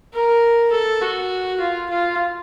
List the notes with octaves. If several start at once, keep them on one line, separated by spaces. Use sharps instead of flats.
A#4
A4
F#4
F4
F4